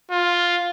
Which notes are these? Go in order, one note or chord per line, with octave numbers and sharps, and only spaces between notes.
F4